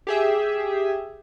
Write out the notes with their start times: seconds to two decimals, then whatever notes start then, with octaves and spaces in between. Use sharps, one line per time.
0.07 G4 G#4 E5